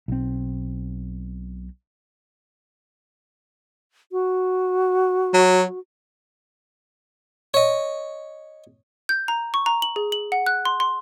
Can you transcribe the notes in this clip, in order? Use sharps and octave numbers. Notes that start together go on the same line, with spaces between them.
B1 C4
F#4
F#3
C#5 D#5
G6
A#5
C#6
A#5
F#7
G#4
F#7
F#5
F#6
C6
C6